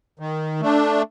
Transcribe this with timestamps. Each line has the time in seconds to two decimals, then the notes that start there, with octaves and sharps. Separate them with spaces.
0.20 D#3
0.61 A3 D4